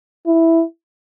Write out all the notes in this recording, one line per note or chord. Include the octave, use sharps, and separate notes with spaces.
E4